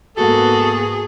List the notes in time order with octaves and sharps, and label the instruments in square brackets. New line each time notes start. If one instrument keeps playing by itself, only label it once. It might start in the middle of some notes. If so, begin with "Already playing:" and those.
[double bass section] G#2 A#3 B3 [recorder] F#4 [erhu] G#4 [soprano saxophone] A4